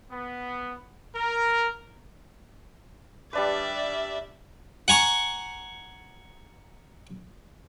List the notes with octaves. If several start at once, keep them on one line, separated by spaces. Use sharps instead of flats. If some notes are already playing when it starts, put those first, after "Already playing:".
B3
A#4
G3 D4 B4 D5 E5
F#5 G#5 A#5 C#6